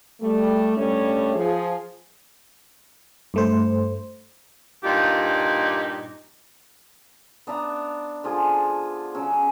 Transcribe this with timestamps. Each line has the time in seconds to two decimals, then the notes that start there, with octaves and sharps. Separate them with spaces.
0.21 G3 A3
0.77 G2 G3 A3 C#4 C#5
1.35 F3 G#4
3.34 G2 A3 C5
4.84 G2 A#2 D#4 F4 G4
7.47 B3 D4 E5 A#5
8.24 D3 F3 F4 G#4
9.15 C#3 F#3 C#4